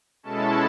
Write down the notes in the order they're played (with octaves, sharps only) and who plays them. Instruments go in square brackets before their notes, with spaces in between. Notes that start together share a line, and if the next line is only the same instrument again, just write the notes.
[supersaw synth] B2 G#3 C#4 E4 A4 A5